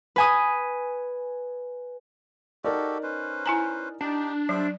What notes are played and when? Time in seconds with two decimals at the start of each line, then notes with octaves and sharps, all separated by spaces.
0.16 B4 G#5 D#6
2.64 D#4 F#4 G4 A4 A#4 D5
3.03 C#4 B4 C5
3.46 E4 G#5 A#5
4.01 D4 D#4 G4
4.49 F#3 G3 C5 E5